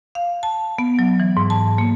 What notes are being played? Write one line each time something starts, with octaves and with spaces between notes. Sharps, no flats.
F5
A5
B3
F#3
E3
G#2
A5
A#3